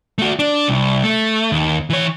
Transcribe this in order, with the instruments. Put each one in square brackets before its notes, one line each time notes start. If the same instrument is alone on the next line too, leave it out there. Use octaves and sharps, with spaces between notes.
[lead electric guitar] A3 F#4
D4
C2
A3
D#2
E3 C#5